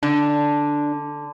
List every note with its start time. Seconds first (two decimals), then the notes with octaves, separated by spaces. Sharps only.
0.03 D3 D4